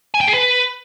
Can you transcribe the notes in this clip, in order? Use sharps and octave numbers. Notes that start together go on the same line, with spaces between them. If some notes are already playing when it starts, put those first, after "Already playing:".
G#5
G5
G#4
B4